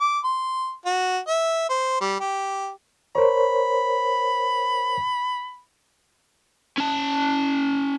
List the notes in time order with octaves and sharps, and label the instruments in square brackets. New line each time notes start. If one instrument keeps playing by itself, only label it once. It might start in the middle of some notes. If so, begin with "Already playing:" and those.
[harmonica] D6
C6
F#4
E5
C5
G3
G4
[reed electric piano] A#4 C5 C#5 [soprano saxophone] B5
[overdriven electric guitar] C#4 A5